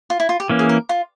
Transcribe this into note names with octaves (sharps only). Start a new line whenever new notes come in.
F4
E4
F4
G4
E3 A#3 C#4
G#4
A#4
F4